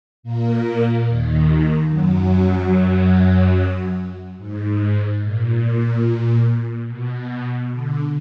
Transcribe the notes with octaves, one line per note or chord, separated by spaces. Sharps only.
A#2 A#3
D#2 D#3
F#2 F#3
G#2
A#2
B2
D3